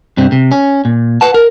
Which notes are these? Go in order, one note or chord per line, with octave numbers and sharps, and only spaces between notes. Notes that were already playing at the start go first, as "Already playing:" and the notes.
G2 C3 C4
C3
C#4
A#2
B4 F#5 A5
A#4